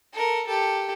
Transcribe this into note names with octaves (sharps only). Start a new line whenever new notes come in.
A4 A#4
G4 A4